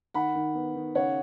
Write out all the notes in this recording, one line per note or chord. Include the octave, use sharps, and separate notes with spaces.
D#3 F#5 B5
D#3
B3
D#3
C#3 C#5 F#5